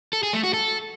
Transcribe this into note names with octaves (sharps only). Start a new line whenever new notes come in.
A4
G#4
A3
F#4
A4